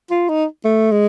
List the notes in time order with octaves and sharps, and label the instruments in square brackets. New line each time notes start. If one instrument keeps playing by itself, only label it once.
[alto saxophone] F4
D#4
A3
G#3